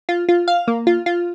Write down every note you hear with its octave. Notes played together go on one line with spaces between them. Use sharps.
F4
F4
F5
A#3
F4
F4